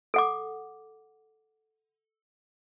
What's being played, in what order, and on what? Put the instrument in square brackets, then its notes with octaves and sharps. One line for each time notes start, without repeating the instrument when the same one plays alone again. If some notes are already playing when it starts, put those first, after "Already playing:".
[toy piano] A4 F#5 D6